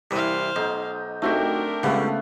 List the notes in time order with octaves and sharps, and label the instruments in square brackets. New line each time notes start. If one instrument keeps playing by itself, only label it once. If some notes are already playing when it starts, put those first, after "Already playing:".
[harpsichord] C2 E3 [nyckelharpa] C5 F5
[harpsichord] B1 [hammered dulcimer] D#4
[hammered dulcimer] A3 C4 G4 [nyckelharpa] D4 A#4 [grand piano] D#4 F#4
[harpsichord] C#2 G3 [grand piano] C#3 F5 F#5 [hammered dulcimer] A3 B3